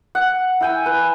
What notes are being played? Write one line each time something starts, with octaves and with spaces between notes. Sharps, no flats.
F#5
E4 G5 G#5
B4